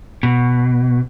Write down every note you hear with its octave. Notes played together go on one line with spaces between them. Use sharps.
B2